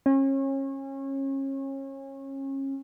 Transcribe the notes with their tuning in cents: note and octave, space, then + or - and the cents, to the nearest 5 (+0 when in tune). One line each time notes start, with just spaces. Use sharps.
C#4 -30